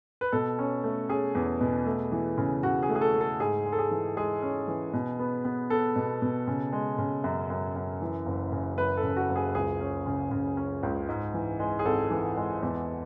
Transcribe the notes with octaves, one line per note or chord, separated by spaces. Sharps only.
B4
B2 A4
C#4
A3
C#4 G#4
E2
B2
A3
E3
C#3
C#3 F#4
G#4
A3
G#4
A4
A3
A4
G#2 G#4
G#3
A4
G#4
E3
G#3 G#4
C#4
E3
B2
B3
B3
B3 A4
B2
B2
C#3
G#3
C#3
F#2
F#2
F#2
E3
F#1
C#3
F#2 B4
A4
C#3
F#4
F#1
G#4
C#2 G#4
C#4
C#3
C#3
C#4
C#2
G#2
E3
G#3
G#4
G#1 A4
E3
G#3
E2